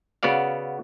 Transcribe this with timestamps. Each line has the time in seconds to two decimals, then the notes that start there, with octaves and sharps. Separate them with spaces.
0.23 C#3 B3 F#4 D5 F5